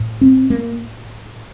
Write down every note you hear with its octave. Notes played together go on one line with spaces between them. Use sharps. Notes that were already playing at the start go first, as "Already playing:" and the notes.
Already playing: A2
C4
A#3